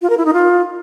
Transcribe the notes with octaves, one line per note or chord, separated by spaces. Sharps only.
F4
A#4
E4
D#4
F4